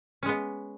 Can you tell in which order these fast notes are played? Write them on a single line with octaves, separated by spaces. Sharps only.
C#4 G#3 B3